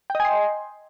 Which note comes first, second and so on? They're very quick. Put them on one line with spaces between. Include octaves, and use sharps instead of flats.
G5 D#5 G#5 C6